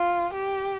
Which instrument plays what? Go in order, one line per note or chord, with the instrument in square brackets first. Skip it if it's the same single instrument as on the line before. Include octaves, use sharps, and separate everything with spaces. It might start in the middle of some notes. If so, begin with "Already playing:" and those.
Already playing: [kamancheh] F4
G4